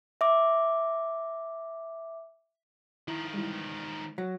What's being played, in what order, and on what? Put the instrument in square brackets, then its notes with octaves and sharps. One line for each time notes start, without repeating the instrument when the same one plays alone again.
[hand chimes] E5 D6
[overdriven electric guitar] D#3 F3 [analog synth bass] E4 [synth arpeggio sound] A#5
[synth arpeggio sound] E3 G3 [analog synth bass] G#3
[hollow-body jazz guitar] F#3 [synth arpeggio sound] A#6